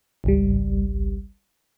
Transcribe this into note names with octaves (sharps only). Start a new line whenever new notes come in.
G#1 C#2 G3